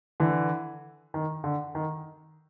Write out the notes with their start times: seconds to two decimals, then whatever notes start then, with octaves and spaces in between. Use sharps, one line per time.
0.20 D3 E3
1.14 D#3
1.44 D3
1.75 D#3